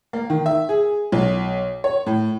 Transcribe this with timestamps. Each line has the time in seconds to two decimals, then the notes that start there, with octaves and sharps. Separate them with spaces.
0.13 A#3
0.30 D#3
0.46 E5
0.69 G#4
1.12 B1
1.84 C#5
2.06 A2